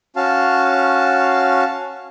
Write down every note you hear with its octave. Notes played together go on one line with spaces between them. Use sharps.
C#4 F#4 F5 A5